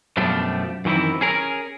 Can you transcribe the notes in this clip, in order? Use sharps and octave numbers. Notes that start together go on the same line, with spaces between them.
F#2 B2 F3 G3 A3 D4
F#2 D#3 E3 C4 E4
C#4 G#4 A#4